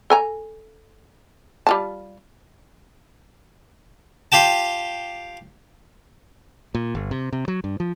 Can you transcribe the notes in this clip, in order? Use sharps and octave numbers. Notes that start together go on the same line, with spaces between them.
A4 G#5 A#5
G3 F4 A5
F4 G4 G5 A5
A#2
G1
C3
C3
F#3
G2
F3